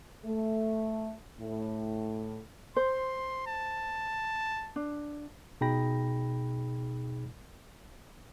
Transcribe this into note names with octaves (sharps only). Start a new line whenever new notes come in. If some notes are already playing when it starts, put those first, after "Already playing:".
A3
A2
C5 C6
A5
D4
B2 D#4 G#4 G5 B5 A#6